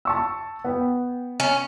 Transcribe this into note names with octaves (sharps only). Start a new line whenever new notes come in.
A5 C#6 E6
B3 G5
C#4